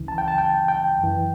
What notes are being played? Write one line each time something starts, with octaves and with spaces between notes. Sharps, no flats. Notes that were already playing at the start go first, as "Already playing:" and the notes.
Already playing: C#2 C#3 E3
A5
G5
A5
G5
G5
F#2 E3